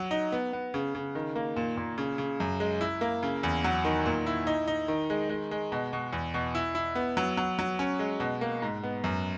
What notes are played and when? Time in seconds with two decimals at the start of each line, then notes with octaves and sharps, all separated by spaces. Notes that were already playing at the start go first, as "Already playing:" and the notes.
Already playing: F#3
0.11 D#4
0.32 B3
0.53 B3
0.74 C#3
0.95 C#3
1.15 D#3
1.36 A#3
1.56 A#2
1.77 A#2
1.98 C#3
2.18 C#3
2.40 F#2
2.60 G#3
2.81 E4
3.01 A#3
3.23 C#3
3.43 E2
3.64 F#3
3.85 D#3
4.06 A#2
4.26 E4
4.47 D#4
4.68 D#4
4.88 D#3
5.10 G#3
5.29 G#3
5.51 G#3
5.72 B2
5.93 B2
6.13 E2
6.34 B2
6.55 E4
6.75 E4
6.95 B3
7.17 F#3
7.37 F#3
7.59 F#3
7.79 C#4
7.99 G#3
8.20 B2
8.41 A#3
8.62 G#2
8.83 B3
9.04 F#2